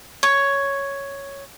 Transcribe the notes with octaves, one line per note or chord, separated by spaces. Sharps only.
C#5